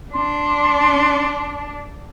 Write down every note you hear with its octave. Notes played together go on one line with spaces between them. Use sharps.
D4 C6